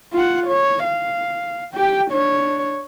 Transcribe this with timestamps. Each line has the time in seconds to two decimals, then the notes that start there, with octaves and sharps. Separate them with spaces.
0.13 F4 F#5
0.47 C#5
0.84 F5
1.74 G4 G5
2.11 D4 C#5